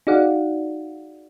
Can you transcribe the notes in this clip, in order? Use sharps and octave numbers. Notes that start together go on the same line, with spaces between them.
D#4 F#4 G#4 D5 F5 F#5